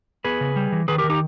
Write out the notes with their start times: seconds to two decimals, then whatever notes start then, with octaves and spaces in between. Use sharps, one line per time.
0.25 B3 G#4 B4
0.41 C#3
0.56 G3
0.72 E3
0.88 D#3 G#4 B4
0.98 G4 A#4
1.04 D#3
1.10 D#4 G4